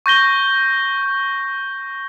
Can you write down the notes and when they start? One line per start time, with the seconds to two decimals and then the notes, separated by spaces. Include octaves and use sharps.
0.06 C#6 G6 A#6 G7